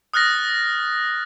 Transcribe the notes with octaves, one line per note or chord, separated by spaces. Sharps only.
D#6 F6 F#6 A6 A#6